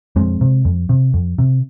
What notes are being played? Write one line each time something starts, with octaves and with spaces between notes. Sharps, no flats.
F2 G#3 C4
C3
F2
C3
F2
C3